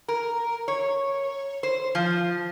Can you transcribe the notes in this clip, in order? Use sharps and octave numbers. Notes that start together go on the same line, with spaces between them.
A#4
C#5
C5
F3